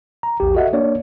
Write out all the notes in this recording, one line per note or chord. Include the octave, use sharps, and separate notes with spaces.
A#5
A#1 E2 G4
F#4 A4 D#5 E5 F#5
A#3 D4 C#5 D5